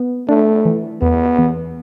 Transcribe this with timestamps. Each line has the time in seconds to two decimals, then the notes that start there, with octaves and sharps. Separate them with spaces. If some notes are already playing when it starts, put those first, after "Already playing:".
Already playing: B3
0.28 A3 D4
0.65 E3
1.02 E2 B3
1.38 E2